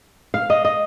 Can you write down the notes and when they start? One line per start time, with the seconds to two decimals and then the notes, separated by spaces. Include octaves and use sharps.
0.34 F5
0.50 D#5
0.65 D#5